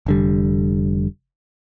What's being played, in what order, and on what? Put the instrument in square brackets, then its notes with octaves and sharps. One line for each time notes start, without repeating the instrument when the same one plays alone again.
[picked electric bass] F1 D3 G3